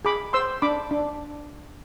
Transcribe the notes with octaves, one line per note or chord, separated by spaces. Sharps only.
G#4 B5 D6
C5 C6 E6
D4 B5 D6
D4